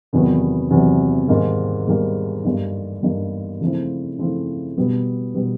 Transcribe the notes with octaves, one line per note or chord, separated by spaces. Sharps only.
E2 C3 D#3 F#3 B3
E2 C3 D#3 F#3 B3
G#2 D#3 G3 A#3 D#4
G#2 D#3 G3 A#3 D#4
G2 D3 G3 A#3 D#4
G2 D3 G3 A#3 D#4
C#3 F3 A3 C4 E4
C#3 F3 A3 C4 E4
B2 G3 B3
B2 G3 B3